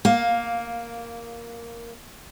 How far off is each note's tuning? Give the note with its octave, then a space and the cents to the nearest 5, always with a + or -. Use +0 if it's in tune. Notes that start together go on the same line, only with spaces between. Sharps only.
A#3 +0 F5 +15